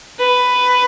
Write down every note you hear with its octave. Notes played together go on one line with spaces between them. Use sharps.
B4